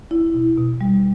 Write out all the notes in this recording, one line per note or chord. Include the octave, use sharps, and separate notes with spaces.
E4
B2
B2
G3